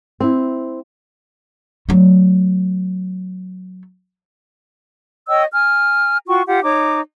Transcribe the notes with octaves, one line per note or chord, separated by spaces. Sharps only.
C4 E4
F#3 A3
C#5 D#5 G5 E6
G#5 F6
F4 F#4 G5 C#6
F4 G4 F#5
D#4 C#5 D6